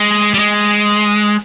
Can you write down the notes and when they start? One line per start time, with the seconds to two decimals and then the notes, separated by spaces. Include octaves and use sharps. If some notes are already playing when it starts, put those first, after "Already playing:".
Already playing: G#3
0.34 G3
0.39 G#3